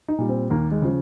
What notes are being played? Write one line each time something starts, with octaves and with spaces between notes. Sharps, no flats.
D#4
A#2 G3
C4
D#2 A#3
G#3
C#3 F3